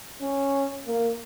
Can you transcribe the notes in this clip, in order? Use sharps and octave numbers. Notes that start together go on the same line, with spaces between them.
C#4
A#3